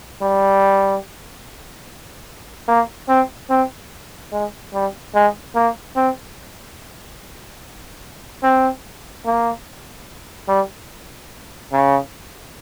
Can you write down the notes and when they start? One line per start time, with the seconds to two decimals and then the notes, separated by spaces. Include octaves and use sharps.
0.22 G3
2.68 A#3
3.08 C4
3.50 C4
4.32 G#3
4.74 G3
5.15 G#3
5.55 A#3
5.96 C4
8.43 C4
9.26 A#3
10.48 G3
11.72 C#3